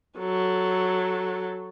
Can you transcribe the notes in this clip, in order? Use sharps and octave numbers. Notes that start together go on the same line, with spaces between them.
F#3 A4